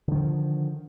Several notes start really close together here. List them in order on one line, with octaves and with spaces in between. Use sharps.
D3 D#3 F3